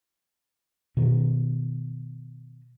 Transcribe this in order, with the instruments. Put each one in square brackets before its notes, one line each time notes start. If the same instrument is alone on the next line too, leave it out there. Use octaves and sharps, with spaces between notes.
[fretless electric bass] B2 D#3